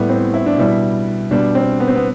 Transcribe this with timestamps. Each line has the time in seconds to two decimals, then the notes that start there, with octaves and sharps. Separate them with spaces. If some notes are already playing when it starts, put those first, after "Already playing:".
Already playing: A2 G3 B3
0.09 C4
0.34 E4
0.46 D4
0.58 B2 G3 E4
1.31 B2 G3 D4
1.55 C4
1.80 B3
1.88 C4
1.96 B3